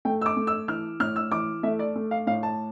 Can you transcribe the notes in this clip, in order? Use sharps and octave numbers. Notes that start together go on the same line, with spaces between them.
A3 G5
E6
D6
A3
E6
E3 F6
A2 F6
E6
E3 D6
A3 E5
D5
A3
F5
A2 F5
A5